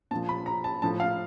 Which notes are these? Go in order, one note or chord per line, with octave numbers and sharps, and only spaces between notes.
A#2 F3 A5
B5
A#5
A5
A2 F3 A5
F5